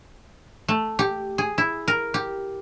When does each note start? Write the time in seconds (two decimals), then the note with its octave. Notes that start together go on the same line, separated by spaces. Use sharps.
0.68 A3
0.99 G4
1.38 G#4
1.58 E4
1.88 A#4
2.14 G4